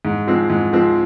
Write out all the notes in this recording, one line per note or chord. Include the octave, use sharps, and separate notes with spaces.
G#2
F3 G#3 C4
G#2
F3 G#3 C4